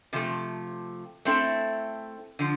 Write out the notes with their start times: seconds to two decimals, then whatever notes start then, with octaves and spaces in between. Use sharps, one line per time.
0.13 C3 F3 A3
1.25 A3 C4 E4 A4
2.39 D3 F3